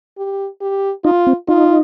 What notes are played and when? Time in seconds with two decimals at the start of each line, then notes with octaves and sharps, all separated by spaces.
0.18 G4
0.61 G4
1.05 D#4 F4
1.27 C4
1.48 D#4 F4